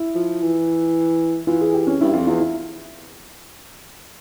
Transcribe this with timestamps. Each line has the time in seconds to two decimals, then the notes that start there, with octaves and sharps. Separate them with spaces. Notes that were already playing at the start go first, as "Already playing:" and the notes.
Already playing: E4
0.15 F3
0.42 E3
1.47 E3 F4
1.61 G#4
1.74 G4
1.87 C#4
2.01 G2 E4
2.13 F2 F4
2.27 E2 F4
2.40 E4